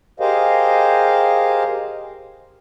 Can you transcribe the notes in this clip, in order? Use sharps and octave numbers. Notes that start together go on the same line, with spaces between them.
G4 G#4 A#4 C5 D#5 F5